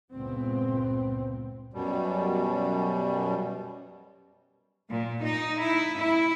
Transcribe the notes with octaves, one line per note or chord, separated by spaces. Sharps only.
C#2 G2 A#2 B3 C4
F#2 B2 G3
A#2
D#4
E4
E4